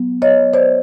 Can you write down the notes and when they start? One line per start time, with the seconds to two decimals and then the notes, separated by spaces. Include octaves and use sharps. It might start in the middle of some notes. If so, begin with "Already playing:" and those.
Already playing: F#3 B3
0.22 C#5 D#5
0.54 C5 D5